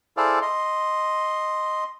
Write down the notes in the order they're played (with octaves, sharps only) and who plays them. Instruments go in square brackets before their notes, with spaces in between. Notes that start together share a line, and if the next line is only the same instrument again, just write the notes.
[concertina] E4 G#4 A4 C5 D5 F5
D#5 C6